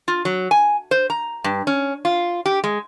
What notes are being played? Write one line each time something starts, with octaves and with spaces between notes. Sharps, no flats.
F4
F#3
G#5
C5
A#5
G2
C#4
F4
G4
G#3